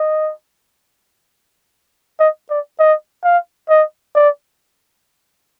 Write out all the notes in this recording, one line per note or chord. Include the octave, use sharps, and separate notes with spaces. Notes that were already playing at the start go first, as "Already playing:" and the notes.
Already playing: D#5
D#5
D5
D#5
F5
D#5
D5